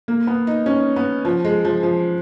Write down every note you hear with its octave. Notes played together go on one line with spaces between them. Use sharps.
A#3
B3
D#4
C#4
B3
F3
G#3
F3
F3